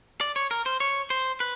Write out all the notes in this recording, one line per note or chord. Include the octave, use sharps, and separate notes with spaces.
D5
C#5
A#4
C5
C#5
C5
B4